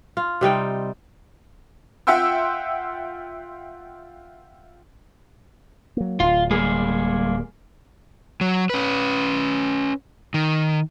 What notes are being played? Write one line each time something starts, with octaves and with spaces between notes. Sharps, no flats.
F4
C3 G3 D#4 G5
F4 E5 F#5 G5 C6 E6
F#3 A#3
D1 F4
G3 A#3 G#4
F#3
C#4 B4
D#3